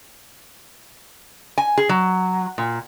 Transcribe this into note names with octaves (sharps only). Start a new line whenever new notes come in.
G#5
G#4
F#3
A#2